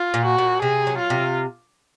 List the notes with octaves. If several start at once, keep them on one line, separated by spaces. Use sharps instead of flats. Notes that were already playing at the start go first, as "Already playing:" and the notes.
Already playing: F4
A#2
F#4
A#2
C3 G#4
F#3
F4
C3